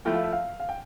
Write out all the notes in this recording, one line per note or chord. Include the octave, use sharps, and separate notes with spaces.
F3 A3 E4 G5
F5
E5
F5
F5
G5